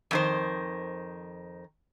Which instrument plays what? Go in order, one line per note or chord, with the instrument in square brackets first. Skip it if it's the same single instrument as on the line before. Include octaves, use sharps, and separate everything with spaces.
[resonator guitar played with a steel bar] F2 D#3 C5